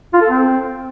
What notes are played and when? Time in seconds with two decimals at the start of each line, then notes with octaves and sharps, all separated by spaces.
0.13 F4
0.21 A4
0.29 C4